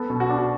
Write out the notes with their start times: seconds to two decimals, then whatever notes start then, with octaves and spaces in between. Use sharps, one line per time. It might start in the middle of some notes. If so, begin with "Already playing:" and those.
Already playing: B3 A4
0.10 B2
0.20 F#4
0.30 D4
0.38 F#4